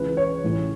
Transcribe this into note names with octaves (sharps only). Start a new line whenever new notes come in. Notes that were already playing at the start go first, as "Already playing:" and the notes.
Already playing: C#2 C#3 E3 B4
C#5
A1 A2 E3